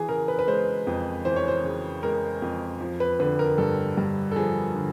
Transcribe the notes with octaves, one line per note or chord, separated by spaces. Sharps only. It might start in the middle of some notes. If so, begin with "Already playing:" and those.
Already playing: E3 G#4
C#3 A#4
B4
B4
G#3 C5
F2
E3 C5
C#5
C5
C#3
G#3 A#4
F2
F3
B4
D3 B4
A#4
G2 A4
G2
A4
F3 G#4
D3